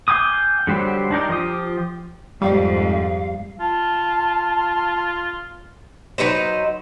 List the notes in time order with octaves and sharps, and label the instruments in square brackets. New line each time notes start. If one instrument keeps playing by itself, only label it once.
[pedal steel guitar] F5 G5 G#5 D6 D#6
D3 F#3 G3 G4 C5
D4 D#4 G4 A#4
F3 F4 G4 D#6
[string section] F2 G#2 [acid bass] G3 [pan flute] F5
[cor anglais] F4 [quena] A5
[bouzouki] F#3 D#4 B4 C5